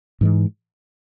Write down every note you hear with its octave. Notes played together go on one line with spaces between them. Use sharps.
G#2 E3 G#3